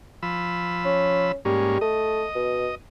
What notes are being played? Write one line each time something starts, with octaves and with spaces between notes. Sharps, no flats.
F3 B5 E6
C#4
G#2 G3 A#3 C#4
A3 D#5
B2